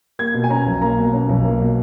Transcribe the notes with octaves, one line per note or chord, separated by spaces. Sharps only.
A#3 G#6
B2
G#5
C#4 A#5
B1
A#3 A#5
B2
C#4
B1
A#3
B2